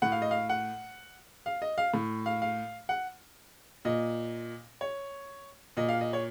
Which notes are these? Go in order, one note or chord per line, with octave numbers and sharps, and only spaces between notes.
A2 F#5
F5
D#5
F5
F#5
F5
D#5
F5
A2
F5
F5
F#5
A#2 D#5
C#5
A#2 D#5
F5
D#5
C#5